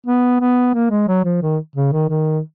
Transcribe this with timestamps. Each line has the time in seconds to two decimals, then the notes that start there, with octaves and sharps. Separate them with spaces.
0.07 B3
0.41 B3
0.74 A#3
0.91 G#3
1.08 F#3
1.24 F3
1.42 D#3
1.76 C#3
1.92 D#3
2.09 D#3